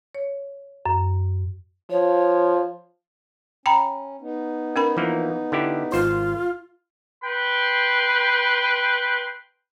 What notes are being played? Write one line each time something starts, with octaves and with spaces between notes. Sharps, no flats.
C#5
F#2
F3 C#5
C#4 G5 A#5 B5
B3 D#4
C#4 A#4 B5
E3 F3 A#3
D3 E4 G4
G#1 F4 C5
B4 G5 C6